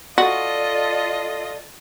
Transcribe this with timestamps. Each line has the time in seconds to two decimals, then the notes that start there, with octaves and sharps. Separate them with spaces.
0.18 F4 F#4 A4 D5 D#5